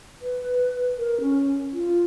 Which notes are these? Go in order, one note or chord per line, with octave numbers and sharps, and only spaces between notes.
B4
A#4
C#4
F4